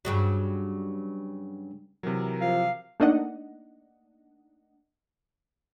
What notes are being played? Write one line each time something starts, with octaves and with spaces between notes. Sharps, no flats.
G2 C#3 F#3
C3 E3 F#3 A#4
F3 F5
A3 A#3 D4 D#4 D#5 F#5